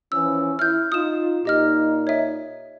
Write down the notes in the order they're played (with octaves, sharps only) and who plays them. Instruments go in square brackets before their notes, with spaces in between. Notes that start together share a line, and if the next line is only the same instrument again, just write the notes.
[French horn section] E3 F3 C#4 [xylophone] E6
[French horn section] E4 [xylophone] F6 G6
[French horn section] D#4 F4 [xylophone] D#6 E7
[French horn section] A#2 D#4 [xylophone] G4 D#5 F6
[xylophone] C#5 E5